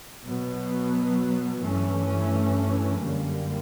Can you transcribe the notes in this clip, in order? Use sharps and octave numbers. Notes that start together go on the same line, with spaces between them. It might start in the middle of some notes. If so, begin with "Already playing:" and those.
B2 F#3 B3
G2 E3 A3 C#4
F#2 D3 G3 A#3